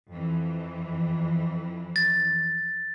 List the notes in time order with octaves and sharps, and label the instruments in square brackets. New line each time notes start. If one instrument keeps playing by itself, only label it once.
[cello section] F2 E3
[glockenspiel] A6